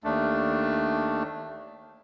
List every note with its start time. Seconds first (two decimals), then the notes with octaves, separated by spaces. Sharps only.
0.04 D#2 A3 D4